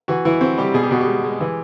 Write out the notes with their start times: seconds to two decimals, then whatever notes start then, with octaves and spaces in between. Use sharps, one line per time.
0.08 E3 F#4
0.25 E3 E4
0.41 C4 F#4
0.58 G3 G4
0.74 B2 G#4
0.83 G4
0.91 B2 F#4
1.01 G4
1.07 G#3
1.24 G#3
1.41 E3